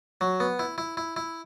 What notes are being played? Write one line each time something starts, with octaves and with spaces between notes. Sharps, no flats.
F#3
B3
E4
E4
E4
E4